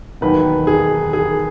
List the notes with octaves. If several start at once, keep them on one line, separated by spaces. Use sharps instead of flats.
E1 D#2 D#3 F#3 B4
G#4
G#4